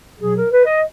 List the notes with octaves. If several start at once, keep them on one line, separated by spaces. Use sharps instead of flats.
B2 F#3 G#4
A#4
B4
D#5